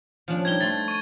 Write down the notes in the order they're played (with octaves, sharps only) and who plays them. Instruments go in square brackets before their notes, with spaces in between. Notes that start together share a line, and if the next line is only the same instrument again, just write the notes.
[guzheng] F3 C#4 D4
[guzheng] G3 D#4 [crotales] G#6 G7
[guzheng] A3 C6 [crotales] A6
[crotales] C#6 D#7